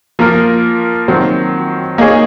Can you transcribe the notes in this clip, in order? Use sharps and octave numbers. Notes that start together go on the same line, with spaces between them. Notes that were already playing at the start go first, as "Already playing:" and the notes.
F3 A#3 F4 A#4
D#3 F#3 C4
A#3 D#4 G#4 C#5